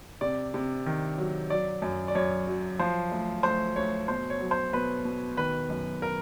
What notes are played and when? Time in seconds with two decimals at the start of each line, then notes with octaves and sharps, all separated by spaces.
0.21 C3 D5
0.54 C3
0.86 D#3
1.18 F#3
1.50 F#3 D5
1.82 F#2
2.08 D5
2.15 F#2 C#5
2.47 F#3
2.79 F3 C5
3.12 D2
3.43 D2 C5
3.76 D2 C#5
4.08 B2 C5
4.30 C#5
4.40 F#3
4.51 C5
4.73 B2 B4
5.05 B2
5.37 D#3 B4
5.70 F#2
6.02 A#4